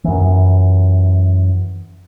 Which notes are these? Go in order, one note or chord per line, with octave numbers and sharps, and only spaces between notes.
F#2 E3